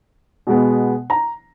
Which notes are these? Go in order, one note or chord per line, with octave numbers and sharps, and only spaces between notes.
B2 G#3 B3
A#5